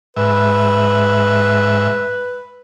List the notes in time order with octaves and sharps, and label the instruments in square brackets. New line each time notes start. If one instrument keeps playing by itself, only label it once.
[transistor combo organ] G#2 E5 [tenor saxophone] B4